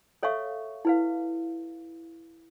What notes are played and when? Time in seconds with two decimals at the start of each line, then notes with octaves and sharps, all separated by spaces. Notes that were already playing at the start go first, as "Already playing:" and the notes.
0.23 A4 C#5 E5 F5 C#6
0.85 E4 B4 F5